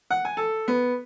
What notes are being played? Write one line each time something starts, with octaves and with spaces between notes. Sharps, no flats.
F#5
G#5
A4
B3